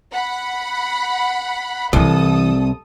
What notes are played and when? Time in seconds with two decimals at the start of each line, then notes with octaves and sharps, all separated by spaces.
0.13 F#5 B5
1.93 C2 E3 E4 A4 D#6